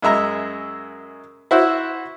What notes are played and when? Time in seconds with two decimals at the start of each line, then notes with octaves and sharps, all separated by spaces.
0.02 F#2 G#3 E5 A#5
1.51 E4 F#4 C5 E5